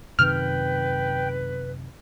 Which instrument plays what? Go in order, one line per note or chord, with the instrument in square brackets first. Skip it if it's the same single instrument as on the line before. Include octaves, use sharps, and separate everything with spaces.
[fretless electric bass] F#2 C3 D#3 [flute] B4 [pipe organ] G5 [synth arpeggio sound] F6